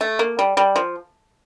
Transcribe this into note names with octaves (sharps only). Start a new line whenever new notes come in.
A3
A#3
G3
G3
F3